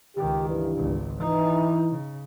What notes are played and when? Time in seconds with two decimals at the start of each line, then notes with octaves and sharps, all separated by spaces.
0.17 C#2 D#3 G4
0.48 G2 E3
0.76 G#1 C#2
1.20 E3 D#4
1.90 C#3